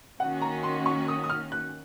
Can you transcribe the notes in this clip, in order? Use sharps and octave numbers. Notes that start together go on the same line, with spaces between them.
D#3 A#3 C#4 F#4 F#5
A#5
C6
C#6
D#6
D#6
F6
F#6